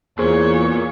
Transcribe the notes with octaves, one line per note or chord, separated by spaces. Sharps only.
E2 A#2 G#4 C5 C#5